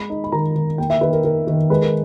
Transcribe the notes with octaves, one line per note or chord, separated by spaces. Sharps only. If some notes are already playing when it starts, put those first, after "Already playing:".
Already playing: G#3 B5
D#4
B5
D#3 A#5
D#3
A#3 G5
E5
D#3 B4
A#4
D#3 A#4
D#3
G#3 B4
A#4